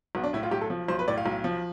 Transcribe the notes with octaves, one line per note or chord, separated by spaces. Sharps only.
B1 B3
D4
A2 E4
F4
B1 G4
A4
F3
B1 C5
B4
A2 D5
F5
B1
F3